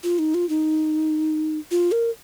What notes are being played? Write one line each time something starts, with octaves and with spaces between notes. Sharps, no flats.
F4
D#4
F4
D#4
F4
A#4